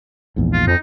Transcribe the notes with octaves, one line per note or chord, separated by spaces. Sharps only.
A#1 E2 G#2
F4
F2 D#4